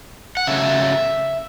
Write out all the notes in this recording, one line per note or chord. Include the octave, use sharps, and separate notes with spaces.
F#5
C#3 F#3 A3 E5